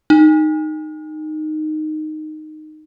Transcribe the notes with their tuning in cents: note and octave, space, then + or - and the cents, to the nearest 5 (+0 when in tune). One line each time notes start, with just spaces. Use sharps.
D#4 -10